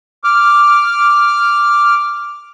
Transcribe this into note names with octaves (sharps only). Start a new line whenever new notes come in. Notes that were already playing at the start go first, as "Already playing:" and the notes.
D6 F6